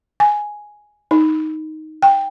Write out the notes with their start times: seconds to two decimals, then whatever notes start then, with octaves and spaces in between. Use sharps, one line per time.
0.20 G#5
1.11 D#4
2.02 G5